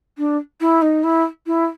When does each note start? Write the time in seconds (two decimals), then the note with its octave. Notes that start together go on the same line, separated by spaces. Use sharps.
0.18 D4
0.61 E4
0.82 D#4
1.04 E4
1.47 E4